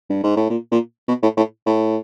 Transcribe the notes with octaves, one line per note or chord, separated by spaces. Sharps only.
G2
G#2
A2
A#2
A#2
B2
A2
A2
A2